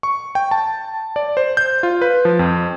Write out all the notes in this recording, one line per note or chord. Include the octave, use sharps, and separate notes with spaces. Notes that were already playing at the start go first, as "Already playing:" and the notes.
C#6
G5
A5
D5
C5
G6
F4
B4
F3
F2